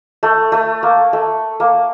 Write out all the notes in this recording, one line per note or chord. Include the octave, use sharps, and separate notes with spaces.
A3
A3
A#3
A3
A#3